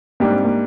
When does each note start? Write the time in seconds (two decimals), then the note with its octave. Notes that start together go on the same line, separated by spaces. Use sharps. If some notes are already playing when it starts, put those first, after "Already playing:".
0.20 G#2 G3 A#3 D4 G4
0.32 C4
0.45 A#3